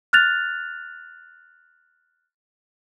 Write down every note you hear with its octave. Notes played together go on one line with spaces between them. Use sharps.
F6 F#6 A6 F7